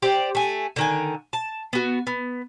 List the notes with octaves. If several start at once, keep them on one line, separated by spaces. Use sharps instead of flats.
G4 C5 D5
A3 G#5
D3 D#3 G#5
A5
B3 F#4
B3